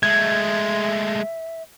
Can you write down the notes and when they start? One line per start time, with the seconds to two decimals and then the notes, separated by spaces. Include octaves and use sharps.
0.03 G#3 A3 E5 G#6